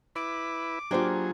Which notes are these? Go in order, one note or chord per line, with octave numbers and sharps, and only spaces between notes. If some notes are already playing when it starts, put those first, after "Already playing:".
E4 B4 D6
F#3 A#3 D4 F4 G4 G#4 C5